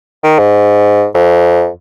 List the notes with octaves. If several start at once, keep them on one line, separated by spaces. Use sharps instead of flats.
D#3
G#2
F2